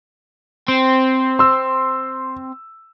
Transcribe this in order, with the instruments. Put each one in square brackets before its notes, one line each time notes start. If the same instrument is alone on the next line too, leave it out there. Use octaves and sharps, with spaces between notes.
[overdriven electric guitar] C4
[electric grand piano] C6 E6